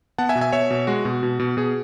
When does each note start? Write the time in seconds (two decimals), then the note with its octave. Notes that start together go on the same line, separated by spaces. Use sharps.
0.18 B3 F#5 A5
0.29 E5 G#5
0.35 B2
0.41 E5 G#5
0.52 B2 C#5 E5
0.71 B2
0.87 G#3 F#4
1.05 B2
1.23 B2
1.39 B2
1.57 B2 G#4